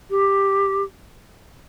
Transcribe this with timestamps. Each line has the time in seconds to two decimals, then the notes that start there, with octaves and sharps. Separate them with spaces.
0.10 G4